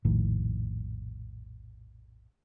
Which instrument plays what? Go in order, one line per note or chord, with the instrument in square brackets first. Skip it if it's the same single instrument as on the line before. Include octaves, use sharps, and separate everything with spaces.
[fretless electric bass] F1 A#1 A2 D#3